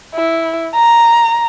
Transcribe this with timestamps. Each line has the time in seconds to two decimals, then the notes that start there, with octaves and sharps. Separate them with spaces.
0.15 E4
0.75 A#5